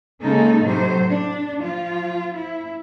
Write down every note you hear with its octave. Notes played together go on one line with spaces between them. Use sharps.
C#3 G#3 A#3 C#4 D#4 A4
A2 C3 F#3 C5
D4
F3 F4
E4